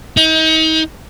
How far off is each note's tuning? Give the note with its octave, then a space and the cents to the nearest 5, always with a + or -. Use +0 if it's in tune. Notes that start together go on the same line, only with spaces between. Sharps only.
D#4 +35